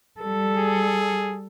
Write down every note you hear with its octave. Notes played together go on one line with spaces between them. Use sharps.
G3 A4
G#4